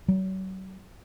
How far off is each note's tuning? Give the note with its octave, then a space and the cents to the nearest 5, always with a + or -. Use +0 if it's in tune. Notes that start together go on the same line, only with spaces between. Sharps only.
F#3 +40